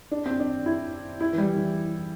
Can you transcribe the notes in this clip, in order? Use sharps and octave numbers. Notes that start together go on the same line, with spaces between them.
D4
C4
D4
E4
E4
E3
G3
E3